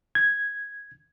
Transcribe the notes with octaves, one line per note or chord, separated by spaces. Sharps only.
G#6